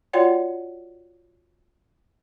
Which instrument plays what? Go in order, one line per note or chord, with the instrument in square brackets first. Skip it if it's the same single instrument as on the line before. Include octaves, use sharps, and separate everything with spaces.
[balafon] F4 F#4 C#5 D5 F#5 G5